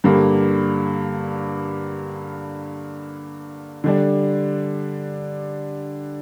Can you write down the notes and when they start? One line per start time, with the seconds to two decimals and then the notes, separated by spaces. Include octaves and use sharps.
0.04 G2 D3 G3 A#3
3.84 D3 G3 D4